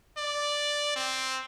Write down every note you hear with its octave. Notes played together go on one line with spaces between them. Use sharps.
D5
C4